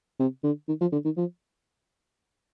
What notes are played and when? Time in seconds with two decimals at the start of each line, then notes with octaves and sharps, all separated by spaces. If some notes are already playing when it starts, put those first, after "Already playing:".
0.19 C3
0.43 D3
0.68 D#3
0.81 F3
0.93 D3
1.05 D#3
1.17 F3